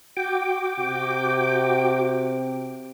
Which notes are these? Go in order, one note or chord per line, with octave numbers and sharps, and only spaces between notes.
F#4 G5 D6
C3